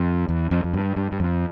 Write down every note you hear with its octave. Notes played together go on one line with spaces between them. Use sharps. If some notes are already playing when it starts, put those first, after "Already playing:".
Already playing: F2
E2
F2
F2
G2
G2
G2
F2